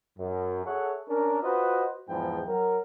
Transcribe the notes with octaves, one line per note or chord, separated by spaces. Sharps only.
F#2
G#4 A4 C#5 E5 F#5
C#4 D4 A#4
F4 F#4 B4 C5 D#5
E2 G#2 F3 B4 G5
F#3 A#4